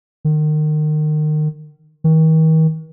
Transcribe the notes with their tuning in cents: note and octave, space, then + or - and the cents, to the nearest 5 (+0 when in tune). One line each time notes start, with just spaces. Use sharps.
D#3 -30
D#3 +40